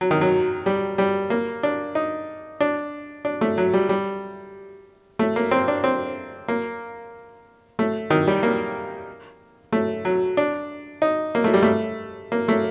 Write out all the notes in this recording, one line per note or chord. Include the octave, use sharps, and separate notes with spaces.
F#3
D#3
F#3
G3
G3
A#3
D4
D#4
D4
D4
A3
F#3
G3
G3
A3
A#3
C4
D4
C4
A#3
A3
D#3
G3
A#3
A3
F#3
D4
D#4
A#3
A3
G3
A3
A#3
A3